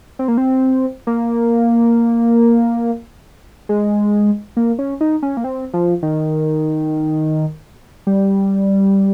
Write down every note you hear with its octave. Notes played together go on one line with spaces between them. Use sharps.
C4
A#3
C4
A#3
G#3
A#3
C#4
D#4
C#4
A#3
C4
F3
D#3
G3